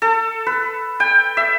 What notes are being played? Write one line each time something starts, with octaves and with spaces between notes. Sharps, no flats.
A4
B4
G5
E5